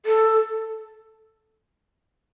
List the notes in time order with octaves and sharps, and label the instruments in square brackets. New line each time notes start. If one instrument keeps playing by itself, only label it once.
[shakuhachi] A4